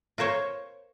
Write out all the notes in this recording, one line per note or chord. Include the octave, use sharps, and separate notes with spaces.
F4 A#4 C5 C#5